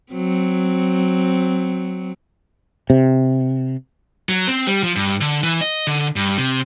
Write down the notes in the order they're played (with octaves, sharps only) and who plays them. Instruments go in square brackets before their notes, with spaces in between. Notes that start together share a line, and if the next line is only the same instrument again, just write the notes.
[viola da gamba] F#3 C4
[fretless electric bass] C3
[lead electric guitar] F#3
C4
G3
F3
G2
D3
E3
D#5
D3
G2
C3